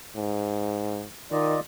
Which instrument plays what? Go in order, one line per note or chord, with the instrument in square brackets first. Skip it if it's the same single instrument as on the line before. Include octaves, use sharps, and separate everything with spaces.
[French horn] G#2
[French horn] D#3 [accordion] F4 D5 D#5